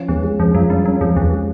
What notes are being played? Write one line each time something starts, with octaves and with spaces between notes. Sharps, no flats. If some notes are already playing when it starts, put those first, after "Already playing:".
Already playing: F3 C#4
E2 G#3
G#3
F2 C#4
F#2 F3
G2 C#4
F#2 C#4
F2 G#3
E2 G#3
G#3